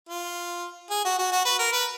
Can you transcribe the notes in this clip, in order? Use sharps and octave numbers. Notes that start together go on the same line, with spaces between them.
F4
G#4
F#4
F#4
F#4
B4
A#4
B4